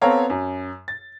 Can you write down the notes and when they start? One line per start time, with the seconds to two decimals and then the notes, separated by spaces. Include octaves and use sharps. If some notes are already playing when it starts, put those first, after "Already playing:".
0.01 B3 C4 A4 C#5 F5 A#5
0.30 F#2
0.88 A6